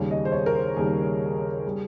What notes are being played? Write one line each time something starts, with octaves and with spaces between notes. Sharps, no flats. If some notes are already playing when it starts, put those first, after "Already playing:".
Already playing: D#2 C#3 G3 G#4
D#5
C5
C#5
A#4
C5
D#2 C#3 G3 G#4
G3